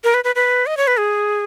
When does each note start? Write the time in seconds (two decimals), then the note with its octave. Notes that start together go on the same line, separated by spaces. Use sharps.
0.04 A#4
0.14 B4
0.24 B4
0.35 B4
0.66 D#5
0.77 C#5
0.87 B4
0.98 G#4